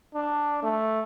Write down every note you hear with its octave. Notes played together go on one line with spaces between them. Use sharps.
D4
A3